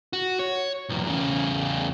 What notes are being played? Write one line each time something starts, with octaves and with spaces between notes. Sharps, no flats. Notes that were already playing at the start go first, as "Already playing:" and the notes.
F#4
C#5
B1 E2
E2 C#3